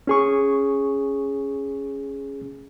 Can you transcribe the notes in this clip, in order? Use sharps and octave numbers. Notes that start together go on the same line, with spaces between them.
C#4 G#4 C#6